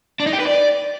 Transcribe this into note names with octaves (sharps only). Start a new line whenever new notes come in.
D4
D#4
G4
B4
D5